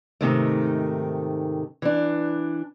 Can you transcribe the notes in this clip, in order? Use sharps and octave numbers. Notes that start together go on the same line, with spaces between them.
G#2 C3 D#3 A3
E3 D4